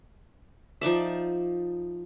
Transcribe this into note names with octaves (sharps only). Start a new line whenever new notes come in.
F3 D#4 D5 E5